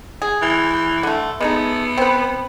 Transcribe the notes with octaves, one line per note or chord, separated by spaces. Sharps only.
G#4
E3
D3 A3
G#3 A3 B3 D#4
C4 B4